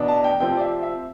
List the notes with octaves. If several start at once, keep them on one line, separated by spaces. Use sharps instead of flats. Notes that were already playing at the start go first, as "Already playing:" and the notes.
Already playing: E2 B2 B3 D4
A5
G5
C3 F3 C4 G5
D5
E5
E5